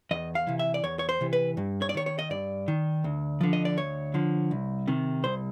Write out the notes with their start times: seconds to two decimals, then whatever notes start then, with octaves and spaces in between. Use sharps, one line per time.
0.11 E2 D#5
0.35 F5
0.47 C3 E3
0.59 E5
0.74 D5
0.84 E2 C#5
0.99 C#5
1.09 C5
1.21 C3 E3
1.33 B4
1.57 G2
1.82 C#5
1.89 D5
1.94 D#3 C#5
2.06 C#5
2.19 D#5
2.30 G2 D5
2.68 D#3
3.04 D2
3.41 D3 F3
3.53 D#5
3.65 D5
3.77 D2 C#5
4.14 D3 F3
4.51 C2
4.88 C3 D#3
5.24 C2 C5